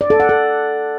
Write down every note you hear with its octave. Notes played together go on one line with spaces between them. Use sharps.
D5
A4
F#5
A4